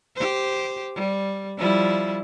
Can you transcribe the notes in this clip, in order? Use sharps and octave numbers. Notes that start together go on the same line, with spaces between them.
G4 C5
G3
F3 G3 E4